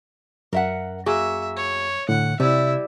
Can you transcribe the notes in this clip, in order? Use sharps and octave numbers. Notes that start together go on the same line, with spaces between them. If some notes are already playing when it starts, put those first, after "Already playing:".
F#2 A#4 E5 F#5
A#3 F#4 G#4 E5
C#5
A2 D3 F#5
C3 G3 E4 E5